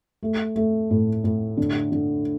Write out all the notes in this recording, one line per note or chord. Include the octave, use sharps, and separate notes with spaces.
A3
A3
A2
A2
D3
D3